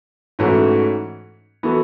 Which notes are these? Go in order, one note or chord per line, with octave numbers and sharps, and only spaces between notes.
G#2 E3 A3 C#4 F#4
E3 B3 F#4 A4